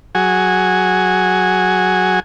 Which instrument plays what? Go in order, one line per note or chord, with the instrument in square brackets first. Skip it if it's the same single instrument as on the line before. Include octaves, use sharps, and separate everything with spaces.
[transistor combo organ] F#3 F#4 G#4 G#5